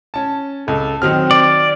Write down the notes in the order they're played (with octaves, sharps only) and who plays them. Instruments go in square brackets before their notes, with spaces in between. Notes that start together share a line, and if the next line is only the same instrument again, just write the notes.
[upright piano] C#4 A5
[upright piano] C#2 [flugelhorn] A4
[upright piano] D#3 F#3 F6 [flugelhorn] C4
[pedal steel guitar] D5